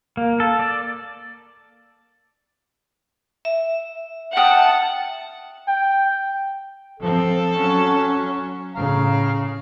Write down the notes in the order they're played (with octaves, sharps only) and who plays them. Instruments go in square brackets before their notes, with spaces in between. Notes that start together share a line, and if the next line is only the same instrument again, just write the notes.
[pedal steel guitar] A#3
A4
D5
[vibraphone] E5
[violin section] F#5 A5 [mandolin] G5 D#6 F6
[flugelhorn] G5
[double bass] F3 C4 [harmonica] A4
[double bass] F#3 C#4
[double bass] A2 C#3 [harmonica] F5 A#5